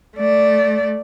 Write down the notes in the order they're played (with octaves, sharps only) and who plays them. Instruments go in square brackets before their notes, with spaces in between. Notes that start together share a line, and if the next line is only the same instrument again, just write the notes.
[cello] A3 D5